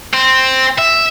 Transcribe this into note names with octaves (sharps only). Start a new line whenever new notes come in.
C4
E5